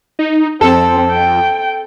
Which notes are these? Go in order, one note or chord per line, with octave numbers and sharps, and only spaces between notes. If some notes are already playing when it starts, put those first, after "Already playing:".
D#4
F2 C4 A4
G5